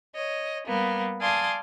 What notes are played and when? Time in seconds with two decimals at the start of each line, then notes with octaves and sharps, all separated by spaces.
0.15 C#5 D#5
0.67 G3 A#3 B3
1.21 D5 F5 G#5 A5 C6 D#6